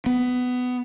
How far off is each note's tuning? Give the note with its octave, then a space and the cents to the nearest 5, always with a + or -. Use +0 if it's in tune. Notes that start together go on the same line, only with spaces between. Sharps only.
B3 +15